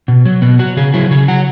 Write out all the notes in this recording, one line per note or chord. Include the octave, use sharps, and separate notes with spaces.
B2
F#3
B2 B3
F#3 F#4
C#3 G#4
F#3 E4
C#3 G#4
F#3 F#5